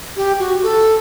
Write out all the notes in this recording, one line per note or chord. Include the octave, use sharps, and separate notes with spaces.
G4
F#4
A4